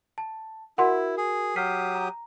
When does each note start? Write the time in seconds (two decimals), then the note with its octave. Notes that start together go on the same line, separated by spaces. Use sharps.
0.18 A5
0.78 E4 F#4 A#4 F#5 C6
1.17 G#4
1.56 F#3 G4 D#6 F6 B6 C7
1.95 A#5